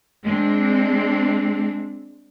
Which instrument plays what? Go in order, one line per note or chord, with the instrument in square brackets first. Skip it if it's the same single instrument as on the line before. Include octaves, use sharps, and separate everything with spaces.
[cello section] G#3 C4 D4